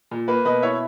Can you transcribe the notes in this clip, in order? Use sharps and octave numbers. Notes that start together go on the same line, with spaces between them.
A#2
A#3 B4
B2 B4 D#5
E4 C#5 E5